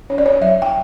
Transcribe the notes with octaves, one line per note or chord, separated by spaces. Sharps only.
C#4 C#5
D5
C#5
F#3 E5
G5